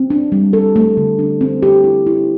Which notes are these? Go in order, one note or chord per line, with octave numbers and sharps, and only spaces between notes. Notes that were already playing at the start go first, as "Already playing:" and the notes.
Already playing: C4
D4
G3
A4
A3
D3
D4
C4
G4
E4
E4